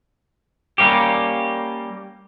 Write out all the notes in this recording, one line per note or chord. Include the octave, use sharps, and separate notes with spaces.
G3 A#3 C#4 G4